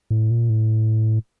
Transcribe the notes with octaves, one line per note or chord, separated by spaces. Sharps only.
A2
A#2
A2